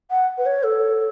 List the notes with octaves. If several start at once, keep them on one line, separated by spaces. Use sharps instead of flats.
F#5
B4
C#5
A4